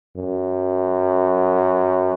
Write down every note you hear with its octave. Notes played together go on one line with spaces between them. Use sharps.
F#2